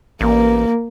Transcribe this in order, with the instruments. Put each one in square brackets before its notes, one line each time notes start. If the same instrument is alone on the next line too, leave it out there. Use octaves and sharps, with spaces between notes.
[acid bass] A1 [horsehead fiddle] A#3